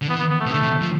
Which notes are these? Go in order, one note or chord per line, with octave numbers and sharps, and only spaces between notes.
D3
E3 B3
B3
B3
A3
C3
D3 A3
C3
F3